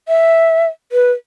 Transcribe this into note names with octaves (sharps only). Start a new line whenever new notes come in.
E5
B4